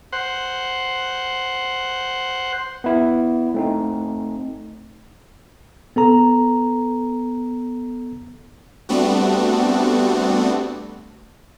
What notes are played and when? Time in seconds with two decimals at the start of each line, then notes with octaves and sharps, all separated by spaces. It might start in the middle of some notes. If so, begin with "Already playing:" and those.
0.13 C5 F#5
2.84 B3 E4
3.54 A3 C4 D#4
5.96 B3 A4 A#5
8.89 G3 A3 B3 C4 D4 F#4